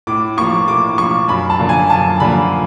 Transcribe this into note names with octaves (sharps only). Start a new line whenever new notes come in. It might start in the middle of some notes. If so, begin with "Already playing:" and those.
A2 D6
F3 A#3 C#6
A2 D6
F3 A#3 C#6
F#2 B5
A5
D3 F3 A#3
G#5
F#2 A5
D3 F3 A#3 B5